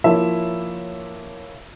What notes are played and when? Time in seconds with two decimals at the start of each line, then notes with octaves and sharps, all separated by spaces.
0.04 F3 A#3 E4 C#5 E5